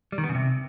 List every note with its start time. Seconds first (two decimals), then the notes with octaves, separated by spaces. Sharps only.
0.12 G3
0.18 D#3
0.24 B3
0.29 C#3
0.35 C3